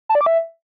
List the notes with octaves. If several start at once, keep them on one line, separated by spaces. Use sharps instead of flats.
A5
D5
D6
E5